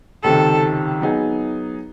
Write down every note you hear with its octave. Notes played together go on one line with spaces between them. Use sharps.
C#2 C3 D#3 A4
F#3 B3 D#4 G#4